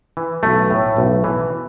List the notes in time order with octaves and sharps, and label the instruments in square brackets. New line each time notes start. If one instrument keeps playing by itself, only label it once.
[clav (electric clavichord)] E3
B1 A3
A2
B1
E3